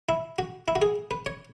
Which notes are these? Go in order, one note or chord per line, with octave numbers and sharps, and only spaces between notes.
E4
F#4
E4
F#4
G#4
B4
C#5